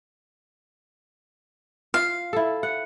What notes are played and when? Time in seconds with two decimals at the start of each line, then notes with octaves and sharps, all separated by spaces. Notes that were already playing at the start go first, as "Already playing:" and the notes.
1.94 F4 F5
2.33 E4 A4
2.63 F#5